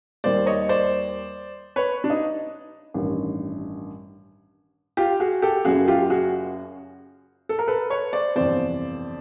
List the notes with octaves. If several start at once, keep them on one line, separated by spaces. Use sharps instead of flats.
D#2 D#3 G3 C5 D5
C#5 D#5
C5 D5
B4 C#5
D4
D#4
A1 G2 D#3
F4 G4
F#4 G#4
G4 A4
F#1 F#2 C#3 F#4 G#4
F4 G4
F#4 G#4
A4
A#4
A4 B4
B4 C#5
C5 D5
G1 F2 C3 E3 C5 D5